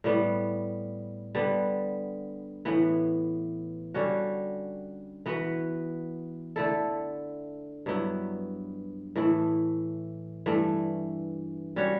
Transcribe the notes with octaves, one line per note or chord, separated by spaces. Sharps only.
A2 G3 B3
D3 G3 B3
A2 E3 B3
D3 G3 C#4 F#4
E3 B3 F#4 B4
D3 A3 E4 A4
G2 F#3 B3 E4
A2 E3 A3 E4
G2 E3 A3
G3 C#4 F#4 C#5